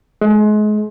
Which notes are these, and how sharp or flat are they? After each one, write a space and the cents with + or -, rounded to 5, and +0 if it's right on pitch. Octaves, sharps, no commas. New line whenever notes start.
G#3 +35